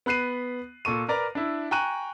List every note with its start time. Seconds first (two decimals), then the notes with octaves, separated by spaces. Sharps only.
0.06 B3 B5 F#6 C7 D#7
0.85 A#2 A4 C#6 D#7
1.08 A#4 B4 D5 A#5
1.35 D4 E4
1.71 G5 G#5 A#5 C#6 F#6 D#7